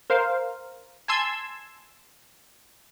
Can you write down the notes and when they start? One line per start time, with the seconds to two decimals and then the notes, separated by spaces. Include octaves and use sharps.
0.10 A#4 C5 F5
1.08 G#5 A5 C6 E6 G#6